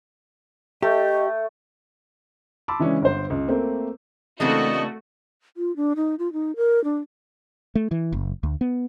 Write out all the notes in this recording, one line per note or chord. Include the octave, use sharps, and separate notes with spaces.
A3 G4 D#5
A5 B5 C6 D6 E6
C#3 E3 G#3 C#4 D4
G1 C5
C#2
A3 A#3 C4
C#3 E3 A3 A#3 C4 D4 F#4 D#5
F4
D4
D#4
F4
D#4
A#4
D4
A3
E3
F#1
D2
B3